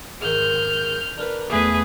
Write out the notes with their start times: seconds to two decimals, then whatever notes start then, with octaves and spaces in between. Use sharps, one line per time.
0.21 G#2 D#3 F6 G6
1.17 D4 A#4 B4
1.50 E2 A3 E4 G#4 B4 G#5